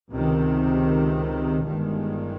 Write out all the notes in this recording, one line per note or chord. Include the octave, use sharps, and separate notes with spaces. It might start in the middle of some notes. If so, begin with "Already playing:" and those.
C#2 C3 D#3
G1 G2 D#3 G#3